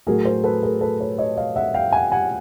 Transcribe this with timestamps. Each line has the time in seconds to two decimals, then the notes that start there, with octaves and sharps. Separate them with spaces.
0.07 A2 F#3 A3 G#4 A#4
0.25 A#4 C5
0.44 A4 B4
0.63 G#4 A#4
0.81 A4 B4
1.00 B4 C#5
1.18 C#5 D#5
1.37 D#5 F5
1.56 E5 F#5
1.74 F5 G5
1.92 F#5 G#5
2.12 F#5 G#5